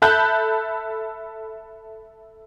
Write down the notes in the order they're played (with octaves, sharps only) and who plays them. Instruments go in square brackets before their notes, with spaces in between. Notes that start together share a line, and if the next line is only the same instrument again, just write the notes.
[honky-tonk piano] A4 E5 A5 B5 F#6 G6